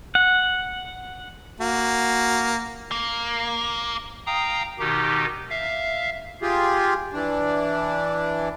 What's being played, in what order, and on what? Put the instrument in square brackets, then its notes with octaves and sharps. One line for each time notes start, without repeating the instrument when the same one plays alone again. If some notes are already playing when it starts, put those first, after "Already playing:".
[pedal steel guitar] F#5
[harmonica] A#3 F#4
[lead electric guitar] A#3
[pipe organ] F5 G5 A#5 D#6
B2 D#3 D#4 G4
E5 F5
[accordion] F4 G4 G#4
E3 D4